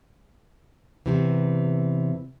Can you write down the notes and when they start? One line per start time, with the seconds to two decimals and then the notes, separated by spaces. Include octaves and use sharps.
1.06 E2 A2 C3 E3